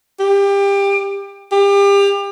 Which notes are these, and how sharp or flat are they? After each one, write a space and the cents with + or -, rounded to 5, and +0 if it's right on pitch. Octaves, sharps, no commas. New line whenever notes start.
G4 +25
G4 +30